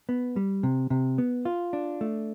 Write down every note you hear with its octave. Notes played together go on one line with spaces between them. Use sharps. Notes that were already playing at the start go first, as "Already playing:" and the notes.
B3
G3
C3
C3
B3
F4
D4
A3